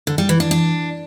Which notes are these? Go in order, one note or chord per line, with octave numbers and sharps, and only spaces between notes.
D3
G3
E3
D4
D4